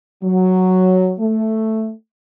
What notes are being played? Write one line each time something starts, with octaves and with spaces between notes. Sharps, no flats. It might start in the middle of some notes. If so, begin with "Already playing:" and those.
F#3
A3